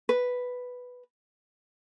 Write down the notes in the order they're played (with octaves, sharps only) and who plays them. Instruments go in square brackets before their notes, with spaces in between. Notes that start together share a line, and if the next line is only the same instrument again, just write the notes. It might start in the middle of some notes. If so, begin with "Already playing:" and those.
[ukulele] B4